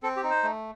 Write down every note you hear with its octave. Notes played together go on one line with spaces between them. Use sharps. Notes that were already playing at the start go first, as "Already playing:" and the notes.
C4 A4
G4
D#4
C5
A3